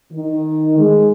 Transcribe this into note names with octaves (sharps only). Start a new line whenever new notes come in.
D#3
G#3